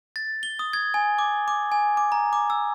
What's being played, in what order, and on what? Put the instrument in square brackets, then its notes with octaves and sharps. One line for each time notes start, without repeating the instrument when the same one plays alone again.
[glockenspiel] A6
G7
D#6
G#6
G#5
D6
D6
G#5
D6
A#5
D6
E6